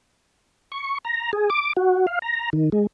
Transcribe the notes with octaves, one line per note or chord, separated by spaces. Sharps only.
C#6
A#5
G#4
D6
F#4
F5
A#5
D#3
G#3